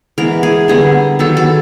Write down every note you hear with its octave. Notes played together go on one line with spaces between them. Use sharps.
E3 G#3 B3 A#4
G#4
D3 G3 B3 G#4
D#3 F#3 B3 A4
A4